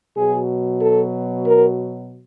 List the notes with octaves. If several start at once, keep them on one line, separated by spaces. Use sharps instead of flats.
B2 F#3 G#4
A4
A#4